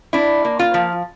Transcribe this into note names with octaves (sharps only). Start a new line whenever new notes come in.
D4 E4
A#3
F4
F3